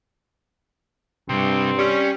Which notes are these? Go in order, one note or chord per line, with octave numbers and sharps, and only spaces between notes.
G2 C3 G3 C4
G3 C#4 C#5